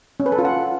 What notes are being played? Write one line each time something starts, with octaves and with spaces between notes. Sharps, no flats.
C#4
B4
A4
F4
F#5